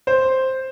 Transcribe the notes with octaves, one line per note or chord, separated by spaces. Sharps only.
C5